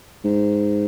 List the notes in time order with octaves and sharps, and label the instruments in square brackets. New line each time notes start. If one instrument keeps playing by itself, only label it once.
[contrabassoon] G#2